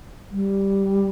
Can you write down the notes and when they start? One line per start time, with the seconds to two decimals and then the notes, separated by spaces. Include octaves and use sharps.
0.31 G3